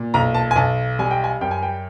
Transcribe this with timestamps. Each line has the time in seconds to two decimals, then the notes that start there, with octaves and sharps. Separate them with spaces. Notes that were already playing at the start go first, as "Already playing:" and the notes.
Already playing: A#2
0.14 B1 A#5
0.34 A5
0.51 G#5
0.56 B1 A5
0.99 G3 G#5
1.11 G5
1.24 G#5
1.41 F#2 G5
1.51 G#5
1.63 G5